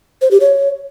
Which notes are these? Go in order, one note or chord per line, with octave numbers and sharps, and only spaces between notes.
C5
G4
C#5